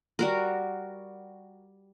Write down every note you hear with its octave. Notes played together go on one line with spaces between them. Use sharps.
G3 F#4 A#4